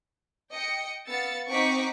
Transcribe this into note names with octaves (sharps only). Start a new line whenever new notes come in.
D#5 G5 C#7
B3 F5 E6 A6 C#7
C4 D#4 F#5 C#6 D6 B6